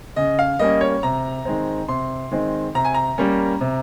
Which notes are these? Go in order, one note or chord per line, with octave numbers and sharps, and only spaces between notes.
C#3 D#5
F5
G3 A#3 C#4 D#5
C#5
C3 A#5
D#3 G#3 C4
C3 C6
D#3 G#3 C4
C3 A#5
G#5
A#5
G3 A#3 C#4
C3